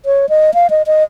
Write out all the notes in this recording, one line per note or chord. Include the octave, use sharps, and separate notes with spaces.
C#5
D#5
F5
D#5
D#5